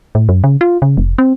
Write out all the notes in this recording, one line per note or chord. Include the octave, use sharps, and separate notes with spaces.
A2
F#2
C#3
F4
C#3
F1
C4